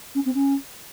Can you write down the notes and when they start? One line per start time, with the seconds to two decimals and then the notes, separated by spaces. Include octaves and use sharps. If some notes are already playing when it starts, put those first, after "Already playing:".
0.15 C#4
0.25 C4
0.34 C#4